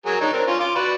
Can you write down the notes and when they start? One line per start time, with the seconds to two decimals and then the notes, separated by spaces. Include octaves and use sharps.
0.06 F#3 G#4 A#4
0.21 D4 D#4 C#5
0.33 C4 D4 A#4
0.47 C#4 F4
0.60 F4 C6 D6
0.75 F#4 B4 D5